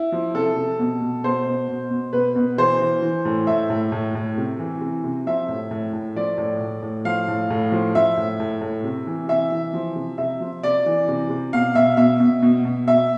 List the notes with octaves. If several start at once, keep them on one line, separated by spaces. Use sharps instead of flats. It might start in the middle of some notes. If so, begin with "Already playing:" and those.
Already playing: E4
F3
C3 A4
C3
B2
B2
B2 C5
B2
B2
B2
B2 B4
B2
E3 C5
E3
E3
A2
A2 E5
A2
A2
A2
C3
E3
C3
C3
F3 E5
A2
A2
A2
F3 D5
A2
A2
A2
F3 F5
A2
A2
F3
F3 E5
A2
A2
A2
C3
E3
C3 E5
E3
F3
C3
C3 E5
F3
C3 D5
E3
C3
C3
B2 F5
B2 E5
B2 E5
B2
B2
B2
B2 E5